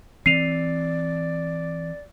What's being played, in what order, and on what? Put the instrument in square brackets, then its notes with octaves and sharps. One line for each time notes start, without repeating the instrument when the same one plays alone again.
[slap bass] E3 C4 [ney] D5 [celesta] C7 D#7 F7